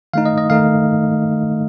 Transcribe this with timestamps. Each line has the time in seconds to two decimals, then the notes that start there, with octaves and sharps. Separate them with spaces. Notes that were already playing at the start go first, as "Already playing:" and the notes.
0.14 D#3 A3 D#4 F5
0.26 D#5
0.38 D#5
0.50 D#3 A3 D#4 F5